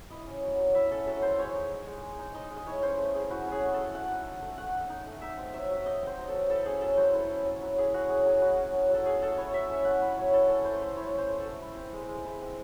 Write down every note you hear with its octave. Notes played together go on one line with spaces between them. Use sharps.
E4 D#5
C#4
F#3
F#3
E4 E5
C#4 A4
F#3 A4
F#3 C5
G#3 C#5
D#4
D#4
G#3
G#3
D#4
D#4 D#5
G#3
D#5
E4 C#5
C#4 C5
A3
A3 G#4
E4 F#4
C#4
G#4
A3
A3 A4
A3 F#5
D#4
D#4
A3
A3 F#5
D#4
D#4
A3
D#4 E5
C4
F#3 E5
F#3
D#4 D#5
C4
C5
F#3
A4
F#3
E4 A4
C#4 G#4
F#3 A4
F#3 C5
E4 A4
C#4
F#3
F#3
E4 G#4
C#4 F#4
F#3 G#4
F#3 G#4
E4 F#4
C#4
F#3
F#3 A4
C#4 G#4
A3 A4
E4 C#5
F#3 E5
C#4 E5
A3 F#5
E4
F#3 C#5
E4 A4
C#4 A4
A3 C5
A3 C5
E4 C#5
C#4 C5
A3
A4
A3
E4
C4
G#3
G#3
E4
C4